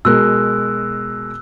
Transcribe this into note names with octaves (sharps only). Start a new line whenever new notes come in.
B2 G#3 A#4 E6 F#6